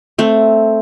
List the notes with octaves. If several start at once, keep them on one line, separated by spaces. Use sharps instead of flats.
A3 C4